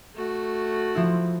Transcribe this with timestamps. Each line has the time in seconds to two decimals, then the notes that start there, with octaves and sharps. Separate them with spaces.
0.15 A3 F#4
0.95 F3 E4